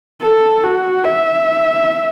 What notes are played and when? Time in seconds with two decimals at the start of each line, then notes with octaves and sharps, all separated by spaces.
0.22 A4
0.64 F#4
1.04 E5